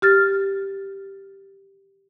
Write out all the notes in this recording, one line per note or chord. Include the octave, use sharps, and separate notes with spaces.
G4 F6 A6